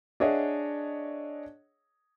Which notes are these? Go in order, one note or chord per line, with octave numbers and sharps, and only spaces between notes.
D4 G#4 C#5 D#5 E5 F#5